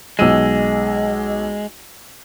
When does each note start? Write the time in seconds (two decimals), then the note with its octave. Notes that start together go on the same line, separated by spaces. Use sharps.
0.19 B1 G#3 E6 D#7